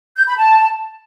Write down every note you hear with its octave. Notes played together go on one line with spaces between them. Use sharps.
G6
B5
A5